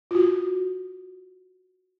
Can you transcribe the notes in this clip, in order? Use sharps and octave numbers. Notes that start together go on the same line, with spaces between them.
F4 F#4